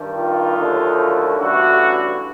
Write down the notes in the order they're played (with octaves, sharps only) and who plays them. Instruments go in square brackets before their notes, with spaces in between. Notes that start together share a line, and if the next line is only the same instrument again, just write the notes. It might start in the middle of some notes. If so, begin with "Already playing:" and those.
Already playing: [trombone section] G2 D#3 G3
D#4 F4
D#2 D3 F#3 A3
A1 G2 D3 E4 F#4